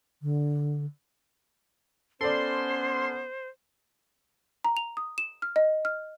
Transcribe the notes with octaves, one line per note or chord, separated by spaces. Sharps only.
D3
B3 C#4 A4 C5 D5 C6
A#5
F7
D#6
E7
F6
D#5
F6